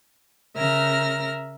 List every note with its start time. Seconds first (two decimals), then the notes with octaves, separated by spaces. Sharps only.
0.56 C#3 A#4 E5 F6 A#6